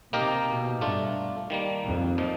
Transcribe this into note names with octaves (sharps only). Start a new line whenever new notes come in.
C3 A#3 D#4 G4 A#4
B2
G2 A3 D4 F4
D#3 G3 A#3
F2
A#2 F3 A#3 D#4